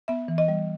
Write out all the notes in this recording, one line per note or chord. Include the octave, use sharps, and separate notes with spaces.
B3 E5
E3
D#5
G3